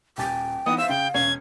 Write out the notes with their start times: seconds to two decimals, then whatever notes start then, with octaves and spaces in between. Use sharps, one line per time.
0.18 D#1 G5 G#5 A6
0.66 E3 B3 D#4 D#6
0.78 C5 E5 F5 E6
0.89 C#3 G5
1.14 E1 C#4 G#6 C7